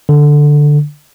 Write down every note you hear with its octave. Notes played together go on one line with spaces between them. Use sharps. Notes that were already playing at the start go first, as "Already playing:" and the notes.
D3